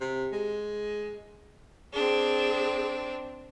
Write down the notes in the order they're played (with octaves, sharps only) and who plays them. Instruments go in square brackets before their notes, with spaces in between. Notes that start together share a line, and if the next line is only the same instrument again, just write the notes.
[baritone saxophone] C3
G#3
[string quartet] C4 D4 [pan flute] G#4